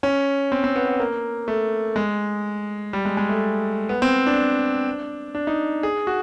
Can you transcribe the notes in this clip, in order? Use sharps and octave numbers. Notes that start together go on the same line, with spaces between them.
C#4
C4
C4
B3
B3
A#3
A3
G#3
G3
G#3
G#3
A3
B3
C4
D4
D4
D#4
G#4
F#4